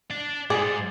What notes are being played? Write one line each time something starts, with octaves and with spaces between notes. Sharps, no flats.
D5 A5
G#2 G#4 D5